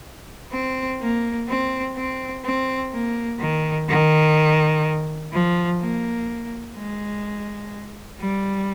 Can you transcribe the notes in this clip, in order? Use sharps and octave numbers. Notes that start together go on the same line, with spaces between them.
C4
A#3
C4
C4
C4
A#3
D#3
D#3
F3
A#3
G#3
G3